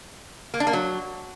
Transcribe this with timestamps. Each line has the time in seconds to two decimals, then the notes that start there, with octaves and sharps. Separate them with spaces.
0.54 A#3
0.60 D4
0.67 A#3
0.73 F#3